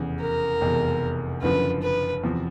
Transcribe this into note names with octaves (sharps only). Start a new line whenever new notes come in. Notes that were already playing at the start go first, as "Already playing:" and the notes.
Already playing: F1 E2 C#3
A#4
F1 E2 B2 G#3
F#1 F#2 D3 F3 B4
B4
E2 C3 F3